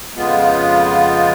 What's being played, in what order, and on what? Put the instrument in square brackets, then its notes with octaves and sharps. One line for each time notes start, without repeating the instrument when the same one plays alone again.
[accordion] F2 C#3 G#3 B3 F4